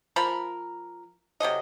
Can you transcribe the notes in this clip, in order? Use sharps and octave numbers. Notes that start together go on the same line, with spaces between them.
F3 A#4 B5
C3 F#3 A4 D#5